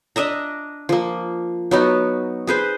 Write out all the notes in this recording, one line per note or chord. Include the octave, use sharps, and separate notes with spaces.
D4 D#5 E5 A#5
F3 A#3
F#3 B3 D#4
G#4 B4 C5